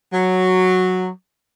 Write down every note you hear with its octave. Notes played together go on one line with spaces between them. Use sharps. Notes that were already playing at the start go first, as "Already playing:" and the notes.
F#3